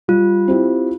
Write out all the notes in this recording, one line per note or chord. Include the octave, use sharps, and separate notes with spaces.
G3 F4
C4 E4 G4